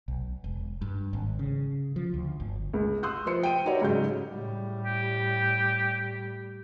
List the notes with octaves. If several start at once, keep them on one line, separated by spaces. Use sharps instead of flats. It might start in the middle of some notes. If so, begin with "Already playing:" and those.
B1
E1
G2
G#1
C#3
F3
D2
G1
C#2
C6 D#6 E6 F#6 G6
F3 C5 C#7
G5 D#7
D#4 F#4 G4 C#5 D5
G#2 C#3 F#3 G6
A2 G3
G4